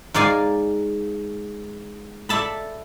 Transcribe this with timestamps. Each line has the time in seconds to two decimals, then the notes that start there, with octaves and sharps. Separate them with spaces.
0.14 G#2 A#4 D5 F5 G#5
2.29 A4 D5 E5 A5 B5